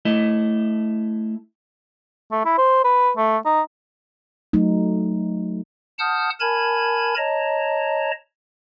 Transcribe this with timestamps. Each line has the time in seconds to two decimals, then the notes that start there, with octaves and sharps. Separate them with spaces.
0.05 A3 E4 D#5
2.31 A3
2.45 E4
2.58 C5
2.84 B4
3.17 A3
3.45 D#4
4.53 F#3 A3 D#4
5.99 F#5 A5 D#6 F6 G6
6.40 A#4 G#5 A5 B5 G#6
7.17 C#5 D#5 A5 A#5